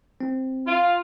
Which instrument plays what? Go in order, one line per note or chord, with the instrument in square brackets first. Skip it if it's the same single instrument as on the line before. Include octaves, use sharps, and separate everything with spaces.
[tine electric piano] C4
[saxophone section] F4